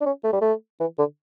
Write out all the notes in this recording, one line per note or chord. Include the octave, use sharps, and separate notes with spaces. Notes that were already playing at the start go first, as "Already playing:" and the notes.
D4
C#4
A3
G3
A3
E3
D3